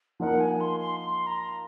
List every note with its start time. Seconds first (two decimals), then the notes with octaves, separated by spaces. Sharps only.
0.20 F3 A#3 D#4 A#4 F#5
0.40 G#5
0.60 C6
0.80 C6
1.00 C6
1.27 A#5